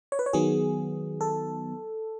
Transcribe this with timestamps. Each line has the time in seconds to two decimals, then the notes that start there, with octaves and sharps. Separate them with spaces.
0.12 C#5
0.19 B4
0.26 C#5
0.33 D#3 F#3 B3 G#4
1.21 A4